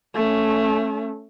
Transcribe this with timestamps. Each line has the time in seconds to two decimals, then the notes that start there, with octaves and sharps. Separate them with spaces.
0.15 A3 C#4